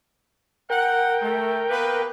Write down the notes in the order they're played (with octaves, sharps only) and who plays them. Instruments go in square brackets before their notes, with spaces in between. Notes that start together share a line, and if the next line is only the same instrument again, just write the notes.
[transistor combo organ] A#4 G5 [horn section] F#5
[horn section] A3
A#3 B3 B4